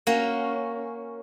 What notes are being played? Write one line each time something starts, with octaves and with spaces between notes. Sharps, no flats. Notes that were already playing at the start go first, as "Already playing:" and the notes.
A#3 C#4 F#4